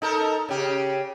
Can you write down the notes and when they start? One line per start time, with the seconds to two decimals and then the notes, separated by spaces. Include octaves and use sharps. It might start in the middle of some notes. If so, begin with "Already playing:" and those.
0.02 D#4 A4 A#4
0.49 C#3 G4